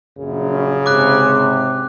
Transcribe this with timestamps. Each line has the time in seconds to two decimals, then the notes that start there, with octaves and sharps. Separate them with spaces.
0.18 A#1 F#2 C#3
0.86 G#2 C3 D6 F#6